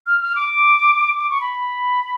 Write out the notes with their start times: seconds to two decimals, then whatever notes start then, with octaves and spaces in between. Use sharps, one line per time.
0.07 F6
0.21 F6
0.35 D6
1.18 D6
1.30 C#6
1.41 B5